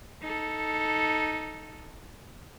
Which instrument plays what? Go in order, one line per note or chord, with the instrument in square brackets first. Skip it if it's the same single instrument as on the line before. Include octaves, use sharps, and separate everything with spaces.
[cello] D#4 A4